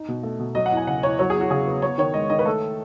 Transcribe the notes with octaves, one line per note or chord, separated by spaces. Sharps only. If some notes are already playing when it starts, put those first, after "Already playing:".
Already playing: D#4
B2
A3
B2
F#3 D#5
F#5
E2
G#5
C#3 F#5
E2 C#5
F#3 C#5
G#4
E2
F#4
C#3 G#4
B3
B3 C#5
D#3 C#5
G#3 D#5
D#3 D#5
B4
A3 A4